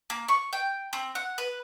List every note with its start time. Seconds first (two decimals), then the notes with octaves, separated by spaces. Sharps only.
0.10 A#3
0.28 C#6
0.53 G5
0.93 C4
1.15 F#5
1.38 B4